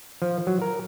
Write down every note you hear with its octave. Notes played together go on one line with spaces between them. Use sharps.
F3
F#3
A#4